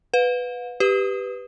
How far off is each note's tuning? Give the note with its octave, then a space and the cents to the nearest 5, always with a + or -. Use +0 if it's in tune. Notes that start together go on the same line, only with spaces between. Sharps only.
B4 +5 F5 +45
G4 +0 B4 +5 D#6 +0